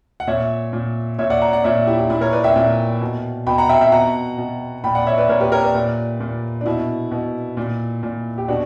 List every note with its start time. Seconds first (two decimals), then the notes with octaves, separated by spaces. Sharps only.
0.20 F#5
0.27 A#2 C#5 E5
0.73 A#2
1.19 A#2 C#5 E5
1.30 D5 F#5
1.41 F#5 A#5
1.53 D5 F#5
1.64 A#2 C#5 E5
1.87 E4 G4
1.98 E4
2.10 A#2 E4
2.21 A#4 C#5
2.33 B4 D5
2.44 E5 G5
2.56 A#2
3.01 B2
3.47 B2 G5 B5
3.58 F#5 A#5
3.69 E5 G5
3.81 E5 G5
3.92 B2 F#5 A#5
4.38 B2
4.84 A#2 G5 B5
4.95 D5 F#5
5.06 C#5 E5
5.18 B4 D5
5.29 A#2 A#4 C#5
5.40 G4 B4
5.52 A#4 C#5
5.63 B4 D5
5.75 A#2
6.20 A#2
6.61 D4
6.66 B2 E4
7.11 B2
7.57 A#2
8.03 A#2
8.38 G4
8.48 B2 D4 F#4